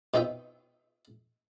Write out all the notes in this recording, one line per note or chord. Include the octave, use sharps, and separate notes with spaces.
B2 C4 D#4 F4 E5 G5